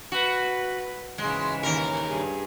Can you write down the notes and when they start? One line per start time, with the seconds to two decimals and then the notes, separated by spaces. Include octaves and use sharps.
0.12 F#4 B4
1.18 G#2 C#3 E3 G#3
1.63 D#2 A#4
2.08 G2 G#4